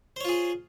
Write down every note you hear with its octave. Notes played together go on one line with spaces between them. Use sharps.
F4 G#4 C5 C#5